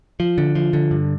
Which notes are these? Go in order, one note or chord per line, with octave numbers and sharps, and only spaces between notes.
F3
D3
F3
D3
G2